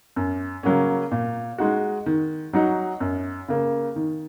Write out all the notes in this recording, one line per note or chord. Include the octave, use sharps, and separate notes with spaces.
F#2
C#3 F#3 A#3 C#4
A#2
G#3 D#4 F#4
D#3
F#3 D#4 F#4
F#2
C#3 A#3
D#3